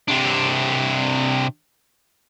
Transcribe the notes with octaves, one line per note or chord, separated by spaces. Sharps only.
C3 D4